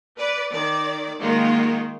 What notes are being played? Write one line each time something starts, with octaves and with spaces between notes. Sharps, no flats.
B4 D5
D#3 D5
D#3 G#3 A#3 F4 F#4